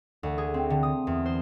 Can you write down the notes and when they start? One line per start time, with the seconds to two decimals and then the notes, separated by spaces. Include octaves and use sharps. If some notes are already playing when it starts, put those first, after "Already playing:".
0.23 D2
0.38 G#4
0.54 C4
0.70 D3
0.83 D#6
1.07 E2
1.26 C5